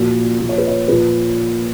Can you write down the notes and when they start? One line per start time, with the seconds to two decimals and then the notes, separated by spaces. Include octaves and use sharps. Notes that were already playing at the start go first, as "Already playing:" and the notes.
Already playing: A#2 F3 F#4
0.39 A#2 F3
0.49 C#5
0.58 B4
0.68 C#5
0.88 A#2 F3 B4